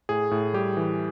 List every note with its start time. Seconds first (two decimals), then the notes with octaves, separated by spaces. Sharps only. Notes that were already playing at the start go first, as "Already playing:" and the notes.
0.09 A2 G#4
0.31 A2
0.54 G3 G4
0.77 E3